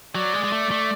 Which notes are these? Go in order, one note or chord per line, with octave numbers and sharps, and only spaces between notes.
F#3 D5
G#3
G#3
A3
A3